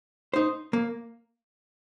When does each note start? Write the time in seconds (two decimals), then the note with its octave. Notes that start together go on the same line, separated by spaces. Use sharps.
0.34 D#4 C5
0.73 A#3